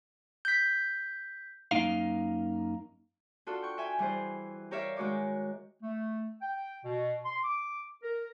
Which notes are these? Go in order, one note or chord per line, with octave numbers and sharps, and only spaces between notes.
G6 B6
F#2 E3 A#3 D#4 F5
D4 F4 F#4 A4
G5 C#6
E5 G5 G#5
E3 G3 E4 G4 G#4 C5
G4 A#4 C#5 D5 E5 F5
D#3 G#3 F#4 C#5 D6
A3
G5
B2
C6
D6
A#4